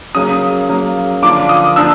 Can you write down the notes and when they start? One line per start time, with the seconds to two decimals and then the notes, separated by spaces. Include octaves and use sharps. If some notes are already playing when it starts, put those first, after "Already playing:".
0.15 C#3 F#3 A#3 D#6
0.69 C#3 F#3 A#3
1.22 D3 F3 A#3 D4 F4 D6
1.49 D#6
1.76 F3 A#3 D4 F4 E6